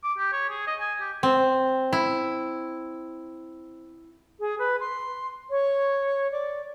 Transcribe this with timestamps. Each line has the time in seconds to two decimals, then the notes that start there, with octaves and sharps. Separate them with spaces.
0.04 D6
0.18 G4
0.33 C#5
0.49 G#4
0.67 D#5
0.80 G#5
1.01 G4
1.23 C4
1.93 E4
4.39 G#4
4.58 B4
4.80 C6
5.50 C#5
6.31 D5